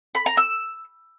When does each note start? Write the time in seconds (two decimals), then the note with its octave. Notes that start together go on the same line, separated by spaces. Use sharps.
0.15 B5
0.26 A#5
0.37 E6